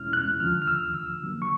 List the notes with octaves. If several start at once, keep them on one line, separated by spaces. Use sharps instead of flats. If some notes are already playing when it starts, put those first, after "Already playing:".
Already playing: E2 B2 G#3 C#4 E4 F6
F#6
D#2 D3 F3 F6
F6
E6
E6
D3 F#3 A#3
C#6